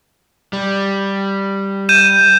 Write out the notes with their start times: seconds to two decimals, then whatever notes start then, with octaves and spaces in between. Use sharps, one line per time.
0.53 G3
1.89 G6 D#7 E7